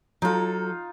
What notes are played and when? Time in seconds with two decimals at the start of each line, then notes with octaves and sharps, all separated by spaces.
0.22 F#3 D#4 F4 A4